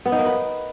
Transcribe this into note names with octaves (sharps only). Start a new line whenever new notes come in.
B3
D#4
A#3
B4